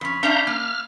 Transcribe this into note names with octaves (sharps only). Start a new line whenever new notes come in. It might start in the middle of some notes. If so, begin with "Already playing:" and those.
F2 C#4 B5
C#4 D4 E5 F5 A#5 G6
A#3 F6